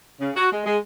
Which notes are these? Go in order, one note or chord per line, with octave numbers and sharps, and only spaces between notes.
C#3
F#4
G#3
G#3